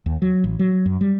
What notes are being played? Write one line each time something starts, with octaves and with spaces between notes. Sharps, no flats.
D#2
F#3
A1
F#3
F#2
G3